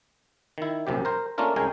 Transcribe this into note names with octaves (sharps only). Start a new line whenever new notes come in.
D#3 E4
A#1 F#2 C3 G4
A#4 C5
A3 A#3 C#4 D4 F4 A#4
C2 G#3 C#4 A#4 G5 G#5